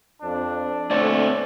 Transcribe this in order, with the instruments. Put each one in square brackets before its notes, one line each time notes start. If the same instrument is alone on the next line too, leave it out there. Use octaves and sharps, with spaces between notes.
[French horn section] F2 C4 [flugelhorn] D4
[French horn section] B2 D3 A3 [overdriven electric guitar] C4 C#5 [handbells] D5